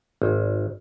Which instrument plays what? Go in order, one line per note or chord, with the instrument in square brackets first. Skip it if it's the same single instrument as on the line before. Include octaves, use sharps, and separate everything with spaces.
[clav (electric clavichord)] G#1